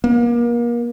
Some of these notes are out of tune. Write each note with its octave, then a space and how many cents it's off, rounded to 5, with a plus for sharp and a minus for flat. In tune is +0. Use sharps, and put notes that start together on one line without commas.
A#3 +35